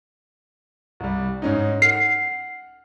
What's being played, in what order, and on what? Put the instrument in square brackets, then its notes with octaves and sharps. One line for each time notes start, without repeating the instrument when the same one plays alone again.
[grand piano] C2 G3
G#2 C#4 D#4
[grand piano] F#5 F6 [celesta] C7